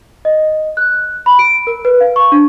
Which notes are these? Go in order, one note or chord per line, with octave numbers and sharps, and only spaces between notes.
D#5
F#6
B5
D7
A#4
B4
F5
C#6
D4